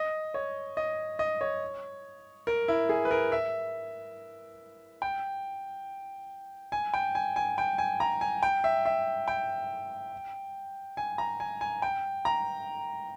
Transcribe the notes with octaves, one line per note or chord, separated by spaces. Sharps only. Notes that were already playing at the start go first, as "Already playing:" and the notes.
Already playing: D#5
C#5
D#5
D#5
C#5
A#4
E4
G#4
B4
A#4
E5
G5
G#5
G5
G#5
G#5
G5
G#5
A#5
G#5
G5
E5
E5
G5
G#5
A#5
G#5
G#5
G5
A#5